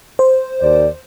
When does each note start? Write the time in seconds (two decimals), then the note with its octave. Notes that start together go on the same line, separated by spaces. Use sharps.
0.19 C5
0.61 D#2 D5